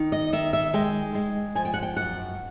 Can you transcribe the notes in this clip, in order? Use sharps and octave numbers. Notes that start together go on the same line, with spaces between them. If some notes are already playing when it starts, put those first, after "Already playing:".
Already playing: D#3
D#5
D#3 E5
E5
G#3 G5
G#3
F3 G#5
G5
F#5
G5
F#2 F#5